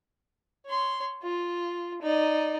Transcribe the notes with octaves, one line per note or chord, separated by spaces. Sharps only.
C#5 C6
F4
D#4 D5